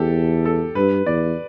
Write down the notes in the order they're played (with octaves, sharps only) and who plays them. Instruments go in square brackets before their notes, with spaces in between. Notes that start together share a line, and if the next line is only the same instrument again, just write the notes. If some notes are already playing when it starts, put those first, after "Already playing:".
Already playing: [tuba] E2 [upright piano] G4 A4
[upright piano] A4
[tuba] G2 [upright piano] B4
[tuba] E2 [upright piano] D5